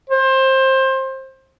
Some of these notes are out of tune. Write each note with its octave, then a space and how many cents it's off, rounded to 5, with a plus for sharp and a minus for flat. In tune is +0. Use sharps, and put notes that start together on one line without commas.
C5 +20